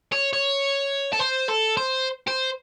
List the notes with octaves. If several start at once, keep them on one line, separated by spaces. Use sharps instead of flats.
C#5
C#5
A4
C5
A4
C5
C5